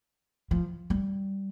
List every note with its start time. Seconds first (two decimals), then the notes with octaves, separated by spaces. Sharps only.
0.51 F3
0.90 G3